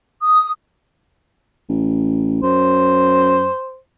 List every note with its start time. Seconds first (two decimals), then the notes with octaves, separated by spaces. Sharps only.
0.23 D#6
1.69 A1
2.43 F#2 C5